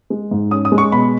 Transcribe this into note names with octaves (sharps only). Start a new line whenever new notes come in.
G#3
G#2
C#4 D#6
D#6
G#3
C#6
B2 B5